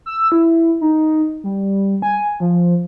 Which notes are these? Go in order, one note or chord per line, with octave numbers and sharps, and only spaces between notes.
E6
E4
D#4
G3
G#5
F3